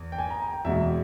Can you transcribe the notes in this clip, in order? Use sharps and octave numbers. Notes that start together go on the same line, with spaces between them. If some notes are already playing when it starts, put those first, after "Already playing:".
Already playing: E2
G5
G#5
A#5
A#5
G5
E2 B2 G#3 E5